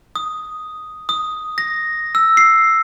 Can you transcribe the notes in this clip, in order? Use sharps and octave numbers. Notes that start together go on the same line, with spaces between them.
D#6
D#6
A#6
E6
C7